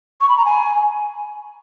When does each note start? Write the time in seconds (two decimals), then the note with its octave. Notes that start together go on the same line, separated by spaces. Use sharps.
0.21 C#6
0.29 B5
0.37 A#5
0.45 G#5